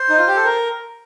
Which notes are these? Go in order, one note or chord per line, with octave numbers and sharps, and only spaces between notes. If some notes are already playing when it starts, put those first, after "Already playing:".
Already playing: C5
D#4
F4
G4
A4
A#4